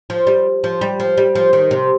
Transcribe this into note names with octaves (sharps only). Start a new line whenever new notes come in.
F3
G3
F3
G3
F3
G3
F3
D#3
C3